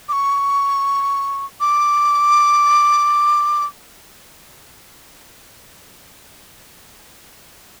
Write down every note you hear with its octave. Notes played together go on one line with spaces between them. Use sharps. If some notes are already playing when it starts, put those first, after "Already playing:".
D6
C#6
D6